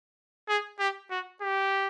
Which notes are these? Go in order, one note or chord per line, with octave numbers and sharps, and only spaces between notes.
G#4
G4
F#4
G4